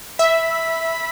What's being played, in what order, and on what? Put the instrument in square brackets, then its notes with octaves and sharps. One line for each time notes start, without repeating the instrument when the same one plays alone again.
[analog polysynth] E5 [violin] B5